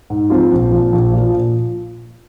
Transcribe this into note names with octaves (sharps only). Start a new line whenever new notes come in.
G#2
F3 C4 F4
A#1
A#2 F3
A#1
A#2 F3
A#2